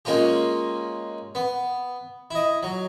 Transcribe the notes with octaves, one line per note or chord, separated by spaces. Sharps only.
G#3 A#3 C#4 F4 G4
B3
E4 D#5
F#3